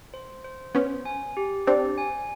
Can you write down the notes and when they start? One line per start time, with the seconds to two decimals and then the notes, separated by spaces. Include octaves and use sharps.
0.14 C5
0.44 C5
0.75 B3 C#4 C5
1.05 G#5
1.37 G4
1.67 C4 D4 G4
1.98 G#5